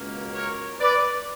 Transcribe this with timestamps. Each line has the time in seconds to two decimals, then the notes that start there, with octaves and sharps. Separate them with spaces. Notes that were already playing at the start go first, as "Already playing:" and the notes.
Already playing: C#2 B2 A#3 C#4
0.34 A#4 C#5
0.80 B4 D5